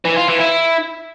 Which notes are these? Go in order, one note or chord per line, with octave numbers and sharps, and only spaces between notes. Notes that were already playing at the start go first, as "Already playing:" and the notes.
E3
F4
E3
E4